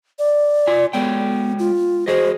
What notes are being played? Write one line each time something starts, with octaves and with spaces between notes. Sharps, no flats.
D5
F4 G#5
G#3 B3 C#5 G5
F4
F#4 G#4 C5 D#5